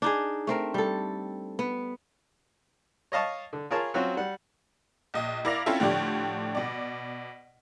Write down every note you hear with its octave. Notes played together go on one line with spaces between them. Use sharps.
D4 D#4 G#4
A3 C4 A#4
G3 A4
B3
C#5 D#5 F5 A5 C#6
D3
F4 G#4 A#4 C#5 A5
F#3 C4 C#4 F4 F#4
G3 F#5
A#1 D#5
E4 A#4 D5 F5 A#6 F7
C4 C#4 E4 F4 A4 E5
A2 D3 F3 D4 G4
B2 D5